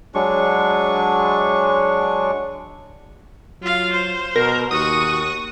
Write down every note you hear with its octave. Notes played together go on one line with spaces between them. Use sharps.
F#3 G#3 D4 C#6
F#3 F4 F5
C5
B2 A#4
D#2 F#4 C#6 D#6